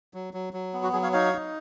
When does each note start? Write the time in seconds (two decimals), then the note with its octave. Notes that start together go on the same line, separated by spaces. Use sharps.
0.14 F#3
0.34 F#3
0.53 F#3
0.73 B3
0.83 F#4
0.93 F#3 G#4
1.03 C#5 F5
1.13 D#4 C#5 F5
1.33 D#4